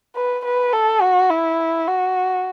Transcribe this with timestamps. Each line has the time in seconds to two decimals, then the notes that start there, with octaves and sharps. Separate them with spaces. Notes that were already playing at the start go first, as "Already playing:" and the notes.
0.16 B4
0.45 B4
0.73 A4
1.02 F#4
1.31 E4
1.88 F#4